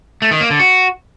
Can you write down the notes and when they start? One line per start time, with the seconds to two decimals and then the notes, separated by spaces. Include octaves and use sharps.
0.22 A3
0.31 D#3
0.41 A#3
0.50 D3
0.60 F#4